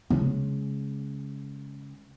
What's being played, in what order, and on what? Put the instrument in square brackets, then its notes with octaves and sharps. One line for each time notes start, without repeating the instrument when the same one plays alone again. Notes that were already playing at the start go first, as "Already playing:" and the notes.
[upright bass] C#3 G#3